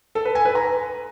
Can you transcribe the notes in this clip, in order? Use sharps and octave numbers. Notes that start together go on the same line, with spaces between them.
A4
B4
G#5
B4
A#5